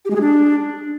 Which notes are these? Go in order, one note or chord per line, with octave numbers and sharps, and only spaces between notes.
G4
G#3
G#4
D4